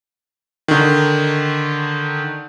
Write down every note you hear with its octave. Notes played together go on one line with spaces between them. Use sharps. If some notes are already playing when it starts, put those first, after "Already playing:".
D3 D#3